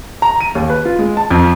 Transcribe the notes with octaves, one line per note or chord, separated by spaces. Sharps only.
A#5
D#7
D#2
B4
F4
G#3
A5
F2